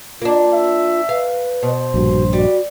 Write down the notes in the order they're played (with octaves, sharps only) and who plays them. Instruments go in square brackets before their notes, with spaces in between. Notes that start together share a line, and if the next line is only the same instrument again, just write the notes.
[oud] A#3 D4 [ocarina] F4
[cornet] E5
[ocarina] B4 [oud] F5
[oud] B2 [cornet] C5
[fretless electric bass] A#1 G2 [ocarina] F#4
[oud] G3 [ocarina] F#4